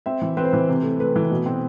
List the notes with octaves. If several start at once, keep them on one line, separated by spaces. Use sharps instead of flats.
C4 E5
E3
C4 B4
C5
E3 B4
C3
A3
A3 B4
E3
B2
C4